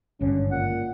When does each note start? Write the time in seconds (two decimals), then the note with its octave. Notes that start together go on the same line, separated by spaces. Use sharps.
0.20 G#1 G2 D3 C#4
0.51 A#2 F#5